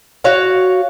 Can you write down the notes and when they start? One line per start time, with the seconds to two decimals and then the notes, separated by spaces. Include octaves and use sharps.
0.24 F#4 C#5 F5